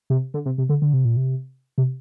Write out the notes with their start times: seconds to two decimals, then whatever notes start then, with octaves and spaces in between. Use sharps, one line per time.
0.10 C3
0.34 D3
0.46 C3
0.58 C3
0.69 D3
0.82 D3
0.93 C3
1.05 A#2
1.16 C3
1.78 C3